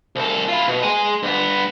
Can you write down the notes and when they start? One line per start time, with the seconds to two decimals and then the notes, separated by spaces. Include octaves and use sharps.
0.16 C2 A4
0.49 E4 F4
0.68 B2
0.83 G#3 G#5
1.23 G2 B3